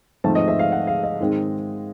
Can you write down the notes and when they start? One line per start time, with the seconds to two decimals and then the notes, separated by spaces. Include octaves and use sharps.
0.24 G#2 F3 A3 C4 A5
0.35 D#5
0.48 E5
0.59 F5
0.72 F#5
0.87 F5
1.03 D#5
1.20 G#2 D#3 G#3 C4